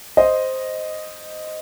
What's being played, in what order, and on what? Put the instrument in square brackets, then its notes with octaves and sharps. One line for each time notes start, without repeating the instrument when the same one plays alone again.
[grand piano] C5 D#5